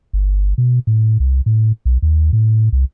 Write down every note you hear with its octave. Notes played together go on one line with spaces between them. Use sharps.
G1
B2
A2
C2
A2
B1
D#2
A2
C2